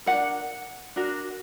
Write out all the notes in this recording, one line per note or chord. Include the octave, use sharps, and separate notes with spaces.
D4 F#4 A#4 F#5
D4 F#4 A#4